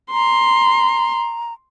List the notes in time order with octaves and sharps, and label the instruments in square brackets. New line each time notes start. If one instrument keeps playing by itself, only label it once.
[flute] A#5 [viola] C6